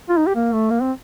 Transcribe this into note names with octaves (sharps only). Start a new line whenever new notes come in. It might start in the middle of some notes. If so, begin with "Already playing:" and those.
F4
D#4
G4
A#3
A3
A#3
C4